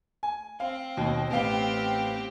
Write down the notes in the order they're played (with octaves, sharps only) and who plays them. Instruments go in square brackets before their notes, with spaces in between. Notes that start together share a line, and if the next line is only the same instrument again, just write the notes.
[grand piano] G#5
[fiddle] C4 [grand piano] F5
[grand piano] D#2 B2
[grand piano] A1 B3 F5 [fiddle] C4 G4